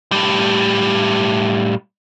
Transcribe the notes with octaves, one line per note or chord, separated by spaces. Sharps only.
A2 G3